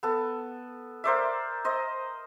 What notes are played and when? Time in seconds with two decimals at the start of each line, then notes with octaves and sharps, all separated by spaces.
0.03 B3 A4
1.04 A#4 C5 D5 E5
1.65 C5 D#5